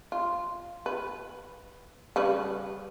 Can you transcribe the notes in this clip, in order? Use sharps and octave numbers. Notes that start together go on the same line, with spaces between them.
F4
B4
C#3 G3 B4